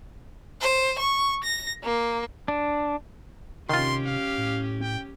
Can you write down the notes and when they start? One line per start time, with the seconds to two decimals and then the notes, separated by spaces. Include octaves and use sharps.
0.61 C5
0.99 C#6
1.44 A#6
1.84 A#3
2.48 D4
3.69 C3 D#3 C#4 F4 G4 C6
4.07 F5
4.38 A2
4.82 G5